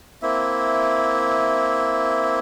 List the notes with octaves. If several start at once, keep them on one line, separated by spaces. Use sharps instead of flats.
A#3 C4 E4 E5